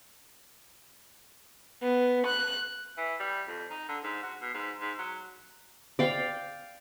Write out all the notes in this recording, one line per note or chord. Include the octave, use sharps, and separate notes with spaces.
B3
F#6
E3
G3
F2
D#4
D3
G#2
F#4
B2
G#2
G#2
F#3
D5 F5 G5